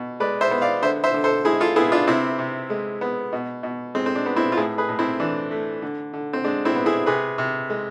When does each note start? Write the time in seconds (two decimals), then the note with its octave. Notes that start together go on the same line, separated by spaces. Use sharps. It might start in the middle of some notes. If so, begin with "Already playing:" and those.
Already playing: B2
0.20 G#3 B4 D5
0.41 C5 E5
0.51 B3
0.62 D5 F5
0.82 D3 C5 E5
1.04 C5 E5
1.14 D3
1.24 A4 C5
1.45 G#3 E4 G#4
1.60 F4 A4
1.76 B3 E4 G#4
1.92 D4 F4
2.07 C3 C4 E4
2.39 C3
2.70 G#3
3.01 B3
3.33 B2
3.63 B2
3.95 G#3 C4
4.06 C4
4.15 D4
4.26 B3
4.36 C4 E4
4.52 F4
4.57 A2 E4 G#4
4.78 G#4 B4
4.89 A2
4.99 C4 E4
5.20 E3 D4
5.51 A3
5.82 D3
6.13 D3
6.33 C4
6.44 G#3 D4
6.65 C4 E4
6.76 B3
6.86 E4 G#4
7.06 C3 G#4 B4
7.38 C3
7.70 G#3